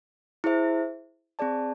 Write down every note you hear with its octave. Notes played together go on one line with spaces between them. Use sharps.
E4 G#4 C5 E5
C4 G#4 D5 A5